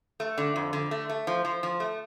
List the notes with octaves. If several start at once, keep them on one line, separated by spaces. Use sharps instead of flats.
A3
D3
F2
D3
A3
A3
F3
F3
F3
A3